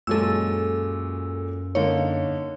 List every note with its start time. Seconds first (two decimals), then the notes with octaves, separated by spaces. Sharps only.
0.07 F#2 A#2 F#3 G#3 A4 E6
1.75 D3 A#3 D#4 C#5